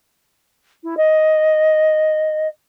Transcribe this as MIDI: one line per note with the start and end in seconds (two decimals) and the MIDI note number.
0.83 0.95 64
0.97 2.47 75